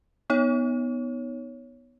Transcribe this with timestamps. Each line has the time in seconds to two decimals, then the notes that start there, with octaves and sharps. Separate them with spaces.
0.30 B3 D#4 C#5